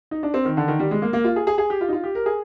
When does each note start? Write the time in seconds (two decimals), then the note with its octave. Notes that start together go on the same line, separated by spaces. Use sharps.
0.11 D#4
0.23 D4
0.34 C4
0.45 D#3
0.57 D3
0.68 D#3
0.79 G3
0.91 G#3
1.02 A#3
1.13 A#3
1.25 F4
1.36 G#4
1.47 G#4
1.58 G#4
1.70 G4
1.81 F4
1.89 D#4
1.93 F4
2.04 G4
2.15 A#4
2.26 G#4